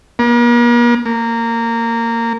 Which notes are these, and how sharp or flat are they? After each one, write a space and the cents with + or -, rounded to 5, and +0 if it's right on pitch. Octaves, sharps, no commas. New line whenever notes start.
A#3 +45
A#3 -15